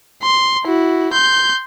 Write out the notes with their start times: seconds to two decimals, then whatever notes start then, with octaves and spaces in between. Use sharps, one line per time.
0.23 C6
0.64 E4 F#4
1.13 C6 G6